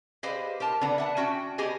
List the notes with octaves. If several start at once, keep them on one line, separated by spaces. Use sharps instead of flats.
G4 G#4 B4 C5 D#5 F5
G4 A#4 A5
D3 B3 A#5
E5 F#5 A5
C#4 F#4 G5
B3 G4 G#4 D#5 G#5